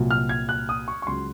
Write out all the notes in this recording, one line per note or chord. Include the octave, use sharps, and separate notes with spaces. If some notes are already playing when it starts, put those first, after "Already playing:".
Already playing: C2 A#2 F#3
F6
G#6
F#6
D#6
C#6
C#6
C#2 C#3 F#3 C6